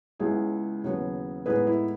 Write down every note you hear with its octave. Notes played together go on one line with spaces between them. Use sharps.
C#2 C#3 G#3 B3 E4 G#4
D#2 C#3 F#3 B3
A2 G#3 B3 D#4 G#4 B4
E4